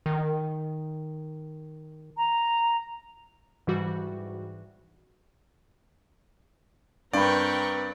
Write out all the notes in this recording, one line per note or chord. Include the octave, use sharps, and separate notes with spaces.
D#3
A#5
G#2 E3 G3 F#4
G2 C4 A#4 B4 D5 G5 B5 C#6